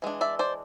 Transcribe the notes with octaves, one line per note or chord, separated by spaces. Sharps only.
E3 G#3 D4
D5 E5
C5 D5